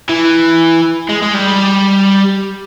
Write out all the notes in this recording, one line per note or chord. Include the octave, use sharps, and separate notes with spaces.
E3
G#3
G#3
G3